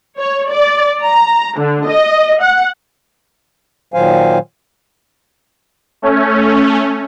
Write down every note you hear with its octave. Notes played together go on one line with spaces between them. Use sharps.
C#5
D5
A#5
D3
D#5
F#5
A#2 D#3 F#3 C5 F5 G#5
A3 C#4